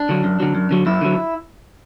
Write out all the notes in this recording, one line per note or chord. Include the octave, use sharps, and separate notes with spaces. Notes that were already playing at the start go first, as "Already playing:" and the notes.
Already playing: D4
D3 F#3
F#2
D3 F#3
F#2
D3 F#3
F#2 E4
D3 F#3